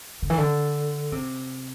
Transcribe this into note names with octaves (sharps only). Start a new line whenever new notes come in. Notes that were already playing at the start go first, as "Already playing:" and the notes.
D3
E3
D3
C3